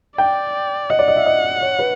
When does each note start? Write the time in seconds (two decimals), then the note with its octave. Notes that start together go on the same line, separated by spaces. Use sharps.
0.17 D5 G5
0.90 D#5 F#5
0.99 D5
1.08 D#5
1.16 E5
1.26 D#5
1.62 C#5
1.79 B4